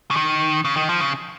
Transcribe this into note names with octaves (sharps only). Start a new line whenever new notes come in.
C#3
D#3
C#3
D#3
F3
C#3